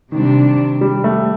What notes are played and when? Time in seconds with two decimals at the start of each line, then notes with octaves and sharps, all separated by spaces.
0.11 C3 D#3 G3 D4
0.81 G3
1.04 A3